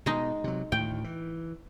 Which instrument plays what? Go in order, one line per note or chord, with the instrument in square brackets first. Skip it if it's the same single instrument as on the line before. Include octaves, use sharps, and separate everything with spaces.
[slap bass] B2 [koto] G#3 D#4
[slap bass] C3 F#3
[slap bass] D2 A2 D#3 [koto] G5
[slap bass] E3